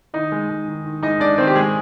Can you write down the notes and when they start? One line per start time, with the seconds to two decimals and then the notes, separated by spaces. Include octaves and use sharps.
0.13 D#3 D#4 D#5
0.32 G#3
0.50 G#3
0.68 D#3
0.85 D#3
1.03 G#3 D#4 D#5
1.20 G#3 D4 D5
1.38 D#3 C4 C5
1.47 G4
1.55 G#3 G#4